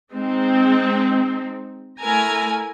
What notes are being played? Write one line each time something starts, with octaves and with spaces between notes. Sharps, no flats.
G#3 C4 D#4
A3 E4 A#4 G#5 A#5